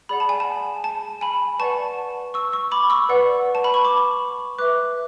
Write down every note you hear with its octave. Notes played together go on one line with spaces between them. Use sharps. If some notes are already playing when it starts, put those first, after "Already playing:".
G#4 D5 F#5 B5
A5
G#5
A5
A5
G#5 B5
B4 D5 F#5 A5 C#6
C#6 E6
C#6 E6
B5 D6
C#6 E6
B4 D5 F#5
A5
B5
C#6
B5 D6
B4 E5 D6 F#6